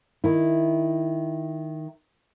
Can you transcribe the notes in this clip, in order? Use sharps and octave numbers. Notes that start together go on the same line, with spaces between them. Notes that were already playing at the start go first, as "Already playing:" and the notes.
D#3 E4